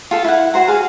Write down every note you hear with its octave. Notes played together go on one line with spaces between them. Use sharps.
F4 A4 A5
E4 F#5
F#4 C5 A#5
G#4 F5 F#5